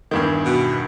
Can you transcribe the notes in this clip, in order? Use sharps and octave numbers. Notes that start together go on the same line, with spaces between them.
E2 G2 D#3
B2